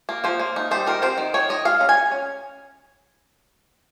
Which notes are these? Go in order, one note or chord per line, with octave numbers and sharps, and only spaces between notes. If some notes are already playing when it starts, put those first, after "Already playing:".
A#3
F3 C5
A#3
D#4
G3 C5
D#3 A#4
C4 C5
D#3
D#3 C#5
D#3 D#5
G#3 F5
C#4 A#5
G#5
C#4
C#4